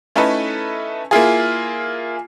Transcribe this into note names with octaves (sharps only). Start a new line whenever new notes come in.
A3 C#4 D#4 E4 A4 B4
A#3 E4 F4 G#4